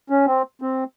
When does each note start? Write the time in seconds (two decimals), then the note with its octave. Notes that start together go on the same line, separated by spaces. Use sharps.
0.10 C#4
0.27 C4
0.62 C4